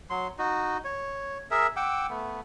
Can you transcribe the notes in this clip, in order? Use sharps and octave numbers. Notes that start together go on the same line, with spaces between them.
F#3 C6
D#4 F#4
C#5
G#4 A#4 E5
F#5 G5 D6 E6
A3 B3